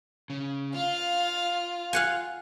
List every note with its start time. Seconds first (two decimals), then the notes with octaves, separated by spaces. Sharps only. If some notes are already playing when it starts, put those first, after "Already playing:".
0.30 C#3
0.74 F4 F5
1.93 F5 F#5 G#5